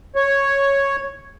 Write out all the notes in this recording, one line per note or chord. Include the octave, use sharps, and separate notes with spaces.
C#5